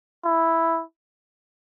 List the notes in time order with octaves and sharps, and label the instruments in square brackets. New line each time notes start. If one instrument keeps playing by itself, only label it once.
[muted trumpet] E4